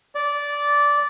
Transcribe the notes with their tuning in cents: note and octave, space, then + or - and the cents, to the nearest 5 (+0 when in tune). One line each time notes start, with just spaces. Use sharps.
D5 -15